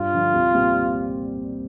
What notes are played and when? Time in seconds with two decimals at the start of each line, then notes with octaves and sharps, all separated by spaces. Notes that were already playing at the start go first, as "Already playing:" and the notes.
Already playing: G2 F4
0.13 D3 F3
0.34 C2
0.54 A#2 G3 C4 G4